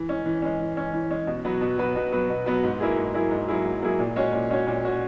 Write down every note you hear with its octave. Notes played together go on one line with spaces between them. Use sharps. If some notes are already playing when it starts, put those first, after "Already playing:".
Already playing: E3
G#3 C#4
E3
G#3 C#4
E3
G#3 C#4
E3
G#3 C#4
B2
F#3 B3 F#4 B4
B2
F#3 B3 F#4 B4
B2
F#3 B3 F#4 B4
B2
F#3 B3 F#4 B4
G#2
F#3 A#3 E4 G#4
G#2
F#3 A#3 E4 G#4
G#2
F#3 A#3 E4 G#4
G#2
F#3 A#3 E4 G#4
A#2
G#3 C#4 F#4 C#5
A#2
G#3 C#4 F#4 C#5
A#2
G#3 C#4 F#4 C#5